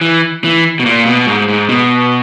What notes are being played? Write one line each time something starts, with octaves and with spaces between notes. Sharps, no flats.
E3
E3
B2
A#2
B2
G#2
G#2
B2